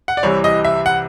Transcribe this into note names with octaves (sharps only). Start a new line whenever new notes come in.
F#5
D5
C2 C3 E3 G3 C#5
D#5
E5
F#5